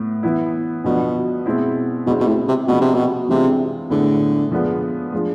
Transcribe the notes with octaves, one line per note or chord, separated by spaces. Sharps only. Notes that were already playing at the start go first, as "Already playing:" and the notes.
Already playing: A2 B3
E3 B3 E4
B2 D3 F3 B3
B2 G#3 C4 E4
B2 D3 G#3 C4 E4
B2
A2
C3
B2 F3 G#3 B3 D4
C3
B2
C3 E3 G#3 D4 F4
A2 D3 G#3 B3 E4
D3 F3 G#3 B3 F4
F3 G#3 D4 F4